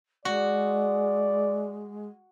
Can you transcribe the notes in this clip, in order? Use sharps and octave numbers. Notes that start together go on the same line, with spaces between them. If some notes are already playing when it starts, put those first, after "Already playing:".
G#3 F#4 D5